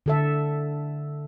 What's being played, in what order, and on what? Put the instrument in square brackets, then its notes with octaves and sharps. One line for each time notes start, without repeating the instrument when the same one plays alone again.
[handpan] D3 A4 E5